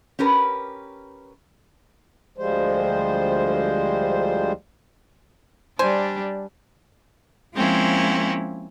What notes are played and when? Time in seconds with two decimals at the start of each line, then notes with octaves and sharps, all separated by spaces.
0.19 C#4 G4 A#4 B4
2.38 D2 F3 G3 G#3 C5
5.79 G3 D4 C5 G#5
7.53 F3 G#3 A#3 C4 C#4 E4